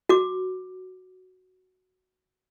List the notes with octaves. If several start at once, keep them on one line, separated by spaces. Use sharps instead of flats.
F#4 D6